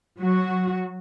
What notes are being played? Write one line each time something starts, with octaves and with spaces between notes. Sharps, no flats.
F#3 F#4